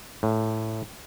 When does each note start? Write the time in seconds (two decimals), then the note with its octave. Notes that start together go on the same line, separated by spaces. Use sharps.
0.23 A2